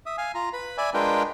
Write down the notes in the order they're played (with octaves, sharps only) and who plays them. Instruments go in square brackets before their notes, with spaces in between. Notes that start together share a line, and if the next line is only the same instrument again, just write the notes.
[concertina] E5 D#6
F5 G#5
F4 A#5
B4 B5
D5 E5 G#5 B5
G#3 D4 F4 A#4 B4 G5